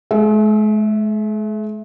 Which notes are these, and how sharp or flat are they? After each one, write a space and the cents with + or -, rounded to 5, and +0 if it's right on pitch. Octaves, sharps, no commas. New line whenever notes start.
G#3 +45 E5 +0